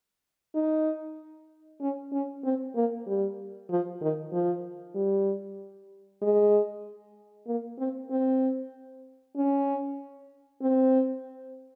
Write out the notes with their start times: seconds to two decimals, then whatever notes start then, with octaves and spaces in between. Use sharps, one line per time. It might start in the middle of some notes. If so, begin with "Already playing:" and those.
0.55 D#4
1.81 C#4
2.12 C#4
2.44 C4
2.75 A#3
3.07 G3
3.70 F3
4.01 D#3
4.32 F3
4.95 G3
6.22 G#3
7.47 A#3
7.79 C4
8.11 C4
9.37 C#4
10.62 C4